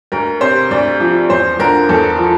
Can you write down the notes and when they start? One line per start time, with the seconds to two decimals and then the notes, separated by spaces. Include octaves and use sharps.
0.12 D2 A#4
0.41 C3 C5
0.71 D2 D5
1.00 F3
1.30 E2 C5
1.59 D3 A#4
1.89 E2 A4
2.18 F3